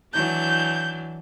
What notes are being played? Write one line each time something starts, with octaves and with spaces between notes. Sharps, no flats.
E3 F#3 D4 G6